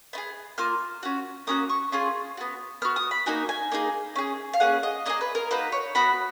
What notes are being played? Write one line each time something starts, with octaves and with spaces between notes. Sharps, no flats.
B3 D#4 G#4
A#3 F4 F6
C#4 F#4
A#3 C#4 F#4 D#6
C#6
C#4 F4 G#4
B3 F#4
B3 F#4 F6
D#6
B5
A#3 D#4 F#4 G#5
G#5
A#3 D#4 G#4
C#4 G#4
F5
A#3 C#4 G#4 F#5
D#5
A#3 D#4 G#4 D#5
B4
A#4
A#3 D#4 F#4 B4
C#5
B3 F#4 B5